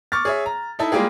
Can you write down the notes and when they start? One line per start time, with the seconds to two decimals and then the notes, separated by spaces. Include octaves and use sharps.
0.12 C#6 D6 F6 A6
0.25 G#4 C#5 E5
0.46 A#5
0.79 D#4 E4 A4
0.92 G3 G#3 A#3 F4 G4 G#4